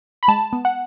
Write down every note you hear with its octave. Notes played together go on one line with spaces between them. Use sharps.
B5
G#3 A5
B3
F#5